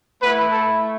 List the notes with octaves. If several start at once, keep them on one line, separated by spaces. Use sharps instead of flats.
A3 B3 E4 B4
A4